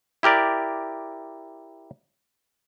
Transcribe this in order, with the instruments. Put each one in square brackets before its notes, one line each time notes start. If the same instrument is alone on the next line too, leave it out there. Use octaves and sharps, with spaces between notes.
[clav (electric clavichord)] E4 G4 A#4 D5